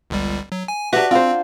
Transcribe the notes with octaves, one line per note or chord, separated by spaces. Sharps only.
G1 C#2 G3
F#3
G#5
D4 F#4 G4 B4 E5
C4 F4 C5